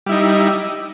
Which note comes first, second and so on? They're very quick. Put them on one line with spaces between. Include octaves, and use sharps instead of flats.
G3 E4 D#4